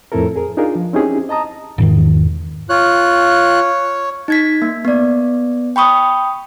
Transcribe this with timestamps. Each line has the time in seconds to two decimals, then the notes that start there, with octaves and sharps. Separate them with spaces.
0.12 F2 A2 C4 E4 A4 A#4
0.36 G#4 A#4
0.57 D4 D#4 F4 G#4 A#4 F5
0.75 F3
0.93 C4 C#4 D#4 E4 G4 G#4
1.29 D#5 A5 A#5 D#6
1.78 E1 G#2 D#3
2.70 F4 C#5 F#6
4.28 D#4 G#6 B6
4.62 A#3
4.85 B3 D5
5.76 G5 B5 C#6 D#6